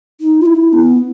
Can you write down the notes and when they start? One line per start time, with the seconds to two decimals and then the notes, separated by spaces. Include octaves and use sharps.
0.20 D#4
0.40 F4
0.46 E4
0.73 B3